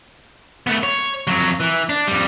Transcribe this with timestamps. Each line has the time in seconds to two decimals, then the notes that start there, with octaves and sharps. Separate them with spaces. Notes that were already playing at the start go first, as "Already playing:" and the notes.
0.67 A3 B3
0.83 C#5
1.27 F2 F#3
1.60 E3
1.89 D4
2.07 F2 G3